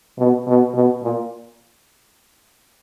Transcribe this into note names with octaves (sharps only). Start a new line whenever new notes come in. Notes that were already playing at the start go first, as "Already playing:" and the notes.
B2
B2
B2
A#2